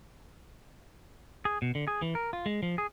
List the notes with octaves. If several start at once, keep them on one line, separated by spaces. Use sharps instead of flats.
G#4
B2
D3
G#4
E3
A#4
F4
G#3
F3
G#4